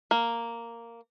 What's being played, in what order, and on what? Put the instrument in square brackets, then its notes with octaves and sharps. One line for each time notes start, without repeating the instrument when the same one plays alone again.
[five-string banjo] A#3